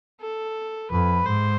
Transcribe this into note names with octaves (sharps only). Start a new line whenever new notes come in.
A4
F2 B4
G#2 C5